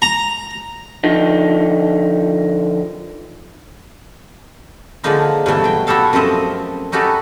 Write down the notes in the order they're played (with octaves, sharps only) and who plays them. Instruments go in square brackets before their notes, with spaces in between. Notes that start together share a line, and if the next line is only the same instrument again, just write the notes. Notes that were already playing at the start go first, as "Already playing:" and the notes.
[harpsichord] A#5
[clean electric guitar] D3 F3 D#4
[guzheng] D3 F3 G#3 A#3 D#4 F4
G2 B2 E3 A3
F#3 G5
E4 F#4 G4 A4 F5
F#2 F3 A3 C4 D#5
C#4 D#4 F#4 G4 A4 B4